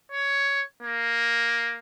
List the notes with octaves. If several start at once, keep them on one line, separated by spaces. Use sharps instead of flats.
C#5
A#3